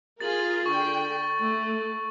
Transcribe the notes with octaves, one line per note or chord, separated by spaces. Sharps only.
F4 G#4 A#4 A6 F#7
D3 G5 C#6
A3